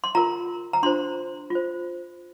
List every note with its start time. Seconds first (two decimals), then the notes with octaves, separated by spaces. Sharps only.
0.04 C6
0.15 F4 A#4 A#5
0.73 A#5
0.83 D4 F4 C5 C6
1.50 F4 C5